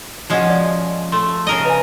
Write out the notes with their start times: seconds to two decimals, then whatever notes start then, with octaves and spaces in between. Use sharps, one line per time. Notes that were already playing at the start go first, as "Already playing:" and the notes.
0.30 F3 G#3 C#4 F#4 D#5 F#5
0.50 D5
1.12 A3 C6
1.47 C#3 A#4 D#5 G7
1.65 B4 G#5